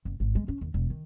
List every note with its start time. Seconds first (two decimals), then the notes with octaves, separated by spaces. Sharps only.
0.05 F#1
0.20 G#1
0.35 G#3
0.48 C#4
0.61 D#2
0.74 E1
0.90 D#3